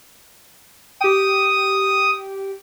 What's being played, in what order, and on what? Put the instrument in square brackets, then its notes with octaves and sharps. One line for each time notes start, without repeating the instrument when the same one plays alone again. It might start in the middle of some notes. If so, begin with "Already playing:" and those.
[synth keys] G4 G5 [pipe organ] D#6